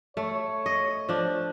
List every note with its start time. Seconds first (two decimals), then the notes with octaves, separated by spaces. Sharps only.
0.17 A3 C#5
0.66 D#5
1.09 F3 D4